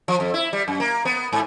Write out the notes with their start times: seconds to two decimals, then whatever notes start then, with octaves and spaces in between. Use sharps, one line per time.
0.08 F3
0.20 F2
0.34 E4
0.53 G3
0.68 F#2
0.80 A#3
1.05 B3
1.32 G#2